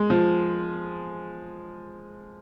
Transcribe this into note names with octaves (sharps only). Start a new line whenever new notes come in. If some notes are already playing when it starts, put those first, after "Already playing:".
Already playing: G#3
F3